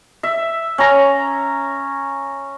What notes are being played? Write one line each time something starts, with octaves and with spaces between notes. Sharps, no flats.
E5
C#4 A#5